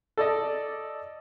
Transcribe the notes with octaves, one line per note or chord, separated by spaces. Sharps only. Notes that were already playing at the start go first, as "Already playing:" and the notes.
A4 D5 D#5